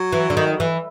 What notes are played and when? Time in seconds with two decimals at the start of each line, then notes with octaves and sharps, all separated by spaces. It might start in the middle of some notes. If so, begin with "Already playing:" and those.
Already playing: F#3
0.13 E3
0.30 D3
0.37 D#3
0.60 E3